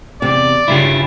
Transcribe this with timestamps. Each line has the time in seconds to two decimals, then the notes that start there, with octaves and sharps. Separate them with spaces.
0.22 E2 C3 D5
0.68 G2 C#3 E4 F4 G4